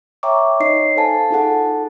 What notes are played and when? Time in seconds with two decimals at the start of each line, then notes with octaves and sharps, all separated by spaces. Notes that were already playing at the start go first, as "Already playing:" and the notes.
0.23 C#5 E5 G5 A#5 C#6 D6
0.60 D#4 C#5 D#5 C7
0.96 A4 C5 F5 G#5 A5
1.30 D#4 F4 G#4 A4 F#5 A5